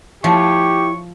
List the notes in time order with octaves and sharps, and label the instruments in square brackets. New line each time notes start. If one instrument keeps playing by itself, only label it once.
[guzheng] F3 [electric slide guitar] E4 C#5 E5 [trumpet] G4 [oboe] C#6